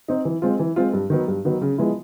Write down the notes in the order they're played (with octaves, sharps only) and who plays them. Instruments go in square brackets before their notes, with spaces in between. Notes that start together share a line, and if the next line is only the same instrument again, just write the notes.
[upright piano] C4 D#4
E3
G#3 C4 F4
E3
G#3 C4 F4
G2
D#3 F#3 B3
G2
D#3 F#3 B3
C#3
F3 G#3 B3 E4